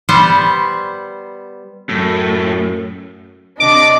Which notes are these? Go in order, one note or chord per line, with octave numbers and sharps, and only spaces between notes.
G3 B3 C5
F#2 A2
C3 D4 D#5 D6